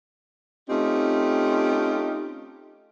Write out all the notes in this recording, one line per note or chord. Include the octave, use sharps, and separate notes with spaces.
A3 C4 C#4 D#4 F4 G4